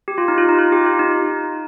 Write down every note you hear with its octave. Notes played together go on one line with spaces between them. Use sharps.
G4
F4
D#4
F4
D#4
F4
G4
F4
D#4